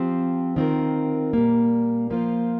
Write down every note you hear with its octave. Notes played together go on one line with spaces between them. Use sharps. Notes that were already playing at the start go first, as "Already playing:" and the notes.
Already playing: F3 C4 G4
D#3 C4 F4 A#4
A#2 G3 A#3
F3 A#3 F4 C5